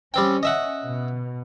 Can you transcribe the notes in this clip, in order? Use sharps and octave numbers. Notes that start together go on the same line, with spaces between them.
G3 C4 C#4 G5
D#5 E5 F#5
B2